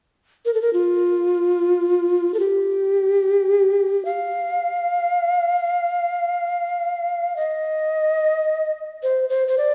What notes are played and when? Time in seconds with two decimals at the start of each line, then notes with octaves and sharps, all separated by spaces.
0.45 A#4
0.54 A4
0.62 A#4
0.73 F4
2.34 A4
2.40 G4
4.05 F5
7.36 D#5
9.03 C5
9.30 C5
9.48 C5
9.58 D5